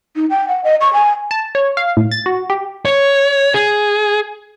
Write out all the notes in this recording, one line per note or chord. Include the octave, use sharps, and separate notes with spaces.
D#4
G5
F#5
D#5
C#6
G#5
A5
C#5
F5
A2
A6
F#4
G4
C#5
G#4